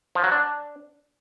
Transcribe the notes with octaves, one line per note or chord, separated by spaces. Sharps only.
F3
F#3
D4